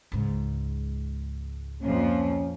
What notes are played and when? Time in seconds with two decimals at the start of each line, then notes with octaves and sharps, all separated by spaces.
0.12 C#2 G#2
1.83 F2 A#2 F3 C#4